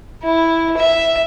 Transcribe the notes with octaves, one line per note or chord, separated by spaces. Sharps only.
E4
E5